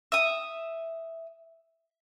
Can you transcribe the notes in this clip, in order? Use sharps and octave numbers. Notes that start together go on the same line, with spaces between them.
E5 D#6